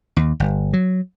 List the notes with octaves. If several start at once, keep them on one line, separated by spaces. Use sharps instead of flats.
D#2
G1
F#3